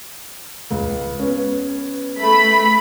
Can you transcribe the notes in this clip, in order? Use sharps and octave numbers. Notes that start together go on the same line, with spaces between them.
C#2
B3 C#4
A3 B5